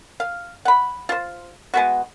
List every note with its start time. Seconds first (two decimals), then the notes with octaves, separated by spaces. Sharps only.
0.20 F5
0.65 F#5 B5
1.09 F4 C5
1.74 G#3 B3 F#4